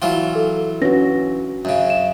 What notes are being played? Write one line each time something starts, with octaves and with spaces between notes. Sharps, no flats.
E3 F#3 F4
A4
C#4 D4 F#4 B4 A#6
F#2 C#3
E7